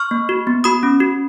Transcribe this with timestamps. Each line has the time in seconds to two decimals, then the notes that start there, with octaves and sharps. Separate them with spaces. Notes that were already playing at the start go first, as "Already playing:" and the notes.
Already playing: C#6 F6
0.11 A#3
0.29 F#4
0.47 B3
0.64 F#4 B5 D#6
0.83 C#4
1.00 F#4